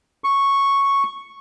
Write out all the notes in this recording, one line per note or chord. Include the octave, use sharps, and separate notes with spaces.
C#6